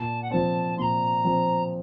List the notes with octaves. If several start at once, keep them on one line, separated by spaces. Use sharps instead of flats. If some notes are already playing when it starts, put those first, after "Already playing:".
Already playing: A#2 A5
F#5
F3 C4 A5
A#2 A#5 C6
F3 C4